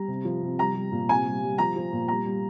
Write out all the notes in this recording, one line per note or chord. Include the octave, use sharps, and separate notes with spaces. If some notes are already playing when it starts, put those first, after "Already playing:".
Already playing: G3 A#5
C3
F3
C3
G3 A#5
G3
A#2
C3 G#5
G3
G3
F3 A#5
F3
A#2
G3 A#5
G3